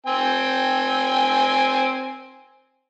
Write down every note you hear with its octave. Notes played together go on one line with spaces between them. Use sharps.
C4 G5 G#5